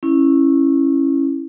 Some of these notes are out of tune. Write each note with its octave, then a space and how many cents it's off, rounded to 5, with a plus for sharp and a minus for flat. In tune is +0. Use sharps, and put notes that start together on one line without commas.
C#4 -15 E4 +0